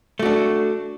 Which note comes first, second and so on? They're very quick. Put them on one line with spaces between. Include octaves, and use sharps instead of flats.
A3 F#4 D4